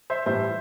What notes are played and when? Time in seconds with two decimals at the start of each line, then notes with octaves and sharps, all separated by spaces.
0.10 C5 E5
0.26 A2 E3 G3 C5 E5